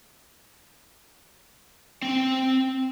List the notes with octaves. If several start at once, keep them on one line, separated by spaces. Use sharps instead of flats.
C4 G5